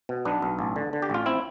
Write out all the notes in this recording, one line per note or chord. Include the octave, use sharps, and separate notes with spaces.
B2
B1 B3 D4
B1
A1
D3
D3
G4
A1 F4
C4 E4